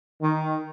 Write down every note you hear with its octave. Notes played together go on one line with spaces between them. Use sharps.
D#3